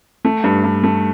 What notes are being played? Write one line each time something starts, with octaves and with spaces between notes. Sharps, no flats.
A3
G2
G2
A3